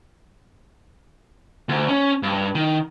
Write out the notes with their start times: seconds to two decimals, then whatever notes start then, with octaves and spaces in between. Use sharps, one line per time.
1.69 D2
1.89 C#4
2.23 G2
2.55 D#3